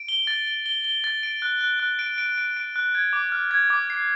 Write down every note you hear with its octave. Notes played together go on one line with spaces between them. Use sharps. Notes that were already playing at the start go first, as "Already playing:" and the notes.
Already playing: D7
G7
A6
G7
G7
G7
A6
D7
F#6
F#6
F#6
D7
D7
D7
D7
F#6
G#6
D6
F6
G#6
D6
C7